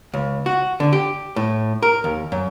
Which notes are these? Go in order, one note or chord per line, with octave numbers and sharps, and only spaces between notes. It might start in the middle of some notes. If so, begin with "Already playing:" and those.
C#2
F#4
D3
G4
A2
A#4
D#2
F#2